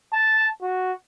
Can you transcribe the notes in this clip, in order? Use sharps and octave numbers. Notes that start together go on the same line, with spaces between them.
A5
F#4